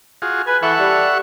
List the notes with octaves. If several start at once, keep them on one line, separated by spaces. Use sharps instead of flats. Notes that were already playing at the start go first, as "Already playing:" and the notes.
F4 F#4 G#4
B4 G#5
E3 A4 E5 F#5 C#6
G3